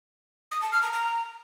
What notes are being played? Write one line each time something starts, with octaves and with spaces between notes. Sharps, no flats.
D#6
A5
F6
A#5
A#5